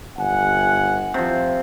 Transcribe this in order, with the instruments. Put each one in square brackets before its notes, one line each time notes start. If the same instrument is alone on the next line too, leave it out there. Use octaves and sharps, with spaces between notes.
[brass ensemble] G1 F#5 G#5
[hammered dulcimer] C3 F3